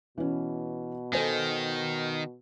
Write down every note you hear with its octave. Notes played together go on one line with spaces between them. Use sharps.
B2 E3 C#4
D#3 A4 C5 G#5